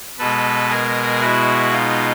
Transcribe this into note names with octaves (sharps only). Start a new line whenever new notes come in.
B2 G#3 A4 B4
G#4 A#4
E4 F#4
D#4 F4